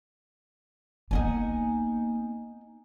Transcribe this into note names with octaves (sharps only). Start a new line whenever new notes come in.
A#3 B3 D#4 F#5 G#5